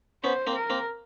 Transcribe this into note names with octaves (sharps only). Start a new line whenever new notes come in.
B3 C#4 C5
A#3 C4
A#4
A#3 C4